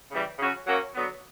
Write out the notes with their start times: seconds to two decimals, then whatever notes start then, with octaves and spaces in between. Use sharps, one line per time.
0.11 C#3 E3 G3
0.39 C#3 F#3 C#4 F#4
0.66 F#3 A#3 C#4 F#4
0.94 D3 F#3 B3